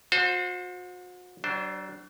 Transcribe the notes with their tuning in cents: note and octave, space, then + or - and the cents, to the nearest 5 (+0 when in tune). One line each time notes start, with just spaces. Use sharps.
F#4 -40 C5 +0
F#3 +40 D4 +0 C5 +0